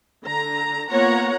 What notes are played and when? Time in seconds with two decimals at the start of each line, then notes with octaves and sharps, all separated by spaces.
0.25 D3 A#5
0.91 A#3 B3 F4 C#5 F#5 A#5